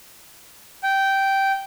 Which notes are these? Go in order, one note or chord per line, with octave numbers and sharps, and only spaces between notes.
G5